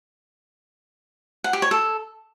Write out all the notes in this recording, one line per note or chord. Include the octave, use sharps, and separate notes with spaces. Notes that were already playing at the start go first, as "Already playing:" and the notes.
F#5
G4
C#5
A4